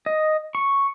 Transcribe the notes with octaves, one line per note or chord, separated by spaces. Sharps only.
D#5
C#6